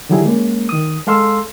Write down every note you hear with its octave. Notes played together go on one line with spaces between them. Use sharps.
D3 D#3 F#3 G3 E4 G#4
G#3 A#3 C#4
D#3 D#6
G#3 A4 F5 C6 E6